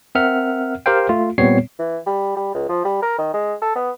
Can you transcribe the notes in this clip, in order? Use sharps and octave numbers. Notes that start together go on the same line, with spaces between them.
C4 A#4 E5 F#5 F6
G4 A#4 C5 F5 G5
A3 F4
A#2 G3 B3 C4 C#5 C7
E3
G3
G3
C#2
F3
G3
A#4
D#3
G#3
A4
B3